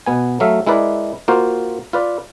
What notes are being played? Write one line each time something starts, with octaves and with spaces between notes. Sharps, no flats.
B2 B3 G#5
F#3 A3 E5 F5
G#3 E4 A#4 B4 D5
A#3 F4 F#4 C5
F4 B4 D5